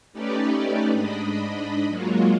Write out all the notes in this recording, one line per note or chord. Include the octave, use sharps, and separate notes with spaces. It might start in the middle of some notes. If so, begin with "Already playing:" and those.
A3 C#4 D#4 G4 B4 D5
G#2 D4 D#5 B5
F#3 G#3 A#3 F4 F#4